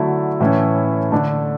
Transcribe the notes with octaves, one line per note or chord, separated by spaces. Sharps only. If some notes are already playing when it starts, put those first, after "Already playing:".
Already playing: D3 F#3 A3 E4
A2 E3 A3 C#4 E4
D3 A3 D4